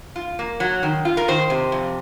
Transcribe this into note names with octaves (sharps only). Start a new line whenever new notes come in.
F4
A#3
F#3
D#3
F4
A#4
D#3 C5
C3
F2